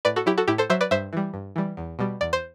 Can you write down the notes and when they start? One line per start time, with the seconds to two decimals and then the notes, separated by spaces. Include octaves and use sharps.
0.05 A2 B4 D5
0.16 F#4 A4
0.26 F#3 E4 G4
0.38 F#4 A4
0.48 A2 E4 G4
0.58 A4 C5
0.70 F#3 C5 E5
0.81 B4 D5
0.91 G2 C5 E5
1.13 E3 G3
1.34 G2
1.56 E3 G3
1.77 E2
1.99 B2 G3
2.21 E2 D5
2.33 C5